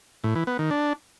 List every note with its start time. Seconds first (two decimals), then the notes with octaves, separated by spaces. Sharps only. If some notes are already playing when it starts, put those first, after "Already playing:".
0.24 A2
0.35 E3
0.47 B3
0.59 D#3
0.71 D4